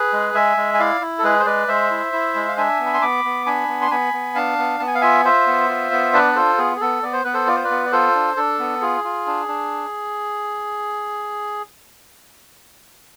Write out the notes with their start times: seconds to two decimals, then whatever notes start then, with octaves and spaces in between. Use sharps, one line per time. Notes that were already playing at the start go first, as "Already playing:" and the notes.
Already playing: G#4 B4
0.13 G#3
0.34 G#3 E5 G#5
0.57 G#3
0.74 G#5
0.79 E4 D5 F5
1.01 E4
1.19 A4
1.23 G#3 G#4 B4
1.40 C5
1.46 G#3 B4 D5
1.68 G#3 C5 E5
1.90 E4
2.13 E4
2.35 G#3
2.48 F5
2.58 D4 E5 G#5
2.80 B3
2.86 B5
2.94 C6
3.01 B3 B5 D6
3.25 B3
3.46 D4 G#5 B5
3.68 B3
3.82 C6
3.91 B3 G#5 B5
4.13 B3
4.35 D4 F5 A5
4.58 B3
4.80 B3 A5
4.87 G#5
4.95 F5
5.01 F4 E5 G#5
5.25 F4 C5 E5
5.47 B3
5.69 F4
5.92 B3
6.13 D4 B4 D5
6.32 D5
6.36 F4 A4 C5
6.58 B3 G#4
6.76 G#4
6.81 B3 A4
7.03 B3 D5
7.13 C5
7.24 B3 B4
7.34 A4 C5
7.47 F4 D5
7.56 C5
7.64 B4 D5
7.70 B3
7.86 D5
7.92 F4 A4 C5
8.15 D4
8.37 D4 A4
8.59 B3
8.81 F4 G#4
9.04 F4
9.27 D4
9.48 D4